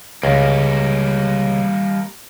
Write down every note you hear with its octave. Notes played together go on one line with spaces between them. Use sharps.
C#2 G3 A#3